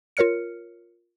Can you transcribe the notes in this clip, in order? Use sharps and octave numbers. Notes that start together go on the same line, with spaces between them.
F4 A#4 C#5 F6 C#7